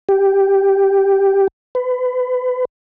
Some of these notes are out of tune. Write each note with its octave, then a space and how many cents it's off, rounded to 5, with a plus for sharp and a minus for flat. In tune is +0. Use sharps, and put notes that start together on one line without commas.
G4 +0
B4 +30